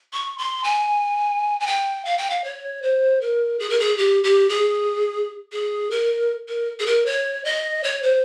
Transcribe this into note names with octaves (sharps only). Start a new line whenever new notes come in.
C#6
C6
G#5
G#5
G5
F5
G5
F5
C#5
C5
A#4
G#4
A#4
G#4
G4
G4
G#4
G#4
A#4
A#4
G#4
A#4
C#5
D#5
C#5
C5